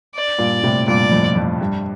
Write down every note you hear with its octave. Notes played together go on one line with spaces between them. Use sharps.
D5
G2 A#2
A2 C3
G2 A#2 D5
F2 A2
F2
G2